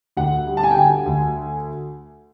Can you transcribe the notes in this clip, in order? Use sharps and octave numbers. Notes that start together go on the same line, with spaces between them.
D2 F#5
G3
A5
G#5
G5
D3 G#5
D2